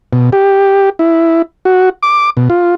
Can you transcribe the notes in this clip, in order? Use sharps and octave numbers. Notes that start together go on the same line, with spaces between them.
B2
G4
E4
F#4
D6
B2
F4